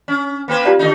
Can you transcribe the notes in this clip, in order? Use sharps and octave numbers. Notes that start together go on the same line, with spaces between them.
C#4
A#3 C4 B4
F4 G4 D5
D3 A3 D#4